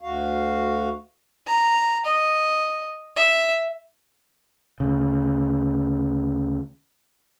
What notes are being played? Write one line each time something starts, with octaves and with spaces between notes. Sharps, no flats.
D2 F#4 F5
A#5
D#5
E5
D2 C#3